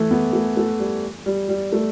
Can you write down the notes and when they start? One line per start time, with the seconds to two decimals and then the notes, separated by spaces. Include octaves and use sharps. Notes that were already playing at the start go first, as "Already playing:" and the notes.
Already playing: E3 A3
0.11 B3
0.33 A3
0.57 A3
0.79 G3
1.26 G3
1.49 G3
1.72 A3